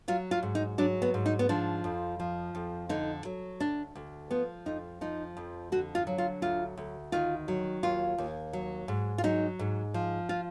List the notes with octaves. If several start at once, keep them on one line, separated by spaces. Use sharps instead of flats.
F#3 F4
F4
G#2
D#4
F#3 D4
B3
G#2
D#4
B3
F3 D4
F2
F3
F2
D3 D#4
F#3
D2 D4
D2
F3 B3
F2 D#4
F3 D#4
F2
D3 F#4
F4
F#3
F4
D2 F4
D2
D#3 F4
F#3
D#2 F4
D#2
F#3
G#2
F4
F#3 D#4
G#2
F3
F4